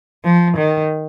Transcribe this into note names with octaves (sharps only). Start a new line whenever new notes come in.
F3
D#3